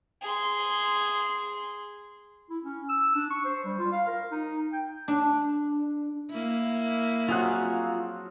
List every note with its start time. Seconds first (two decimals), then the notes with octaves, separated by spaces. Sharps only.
0.22 G#4 C6
2.49 E4
2.63 C#4
2.89 E6
3.15 D4
3.31 C#6
3.45 C5
3.65 G3
3.78 F4
3.92 F5
4.07 A#4
4.31 D#4
4.73 G5
5.08 D4
6.30 A#3 E4
7.29 F3 F#3 C4 F4 G#4 F#5